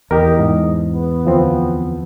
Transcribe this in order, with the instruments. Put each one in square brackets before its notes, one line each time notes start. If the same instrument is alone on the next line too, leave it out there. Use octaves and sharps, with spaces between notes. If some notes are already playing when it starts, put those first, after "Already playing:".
[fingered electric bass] E2 [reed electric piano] G4 A#4 [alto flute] D#5
[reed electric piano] G#2
[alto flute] B3
[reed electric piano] D2 F3 C4